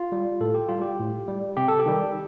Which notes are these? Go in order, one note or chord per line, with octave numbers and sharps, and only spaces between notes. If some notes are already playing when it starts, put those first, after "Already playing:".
Already playing: F4
G3
A2 A4
G4
G3 F4
G4
A2
G3
C3 G4
A4
G4
D#3 G3